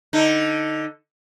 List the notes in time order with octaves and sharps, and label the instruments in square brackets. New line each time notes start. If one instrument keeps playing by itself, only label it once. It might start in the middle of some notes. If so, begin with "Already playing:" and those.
[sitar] D3 D#4